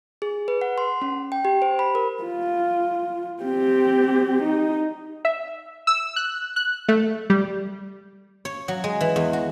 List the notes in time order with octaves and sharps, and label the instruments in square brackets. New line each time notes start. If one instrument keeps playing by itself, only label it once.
[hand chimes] G#4
B4
F#5
C6
C#4
G5
G4
C5
B5
A#4
[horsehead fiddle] F4
C4 G4
D#4
[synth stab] E5
E6
F#6
F#6
A3
G3
[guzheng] C#5
F#3
G#3
E3
E2
F#4